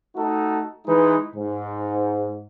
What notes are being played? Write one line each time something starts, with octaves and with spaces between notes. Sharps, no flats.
A3 D#4 F#4 A4
E3 G#3 D#4 B4
G#2